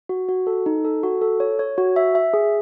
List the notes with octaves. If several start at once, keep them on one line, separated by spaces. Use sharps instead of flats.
F#4
F#4
A4
D#4
A4
F#4
A4
C#5
C#5
F#4
E5
E5
G#4